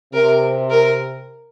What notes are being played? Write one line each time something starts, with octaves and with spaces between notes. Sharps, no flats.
C3 A#4
A#4